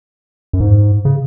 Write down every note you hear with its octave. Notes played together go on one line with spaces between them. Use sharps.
F#2
G#2
C#3